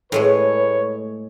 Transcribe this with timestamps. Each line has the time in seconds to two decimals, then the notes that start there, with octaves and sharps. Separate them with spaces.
0.12 A2 G#3 A3 B4 C#5